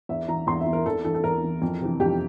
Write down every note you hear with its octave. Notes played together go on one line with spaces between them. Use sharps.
E2 E5
E3 A#5
E2 C6
E5
E3
A#4
E2 A4
E3 A4
A4
E2 A#4
E3
F2
C3 E3
F2 G4